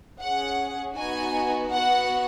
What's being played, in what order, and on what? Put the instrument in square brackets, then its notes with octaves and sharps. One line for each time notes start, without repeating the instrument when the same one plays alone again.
[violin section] C#4 G#4 F#5
B3 D#4 F#4 G#5
B3 F#4 F#5